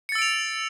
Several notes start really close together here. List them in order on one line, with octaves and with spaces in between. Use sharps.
C#7 A6 E6 D7 F7